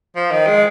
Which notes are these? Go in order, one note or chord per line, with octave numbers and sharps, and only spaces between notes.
F3
D#3
G#3